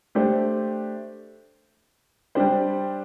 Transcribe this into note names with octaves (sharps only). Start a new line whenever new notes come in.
A3 D4 G4 C5
G3 D4 G4 C5